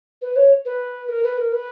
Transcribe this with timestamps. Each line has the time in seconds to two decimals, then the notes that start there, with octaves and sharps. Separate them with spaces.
0.22 B4
0.36 C#5
0.65 B4
1.09 A#4
1.24 B4
1.38 A#4
1.52 B4